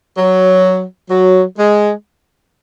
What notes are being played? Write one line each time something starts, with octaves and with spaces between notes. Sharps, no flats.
F#3
F#3
G#3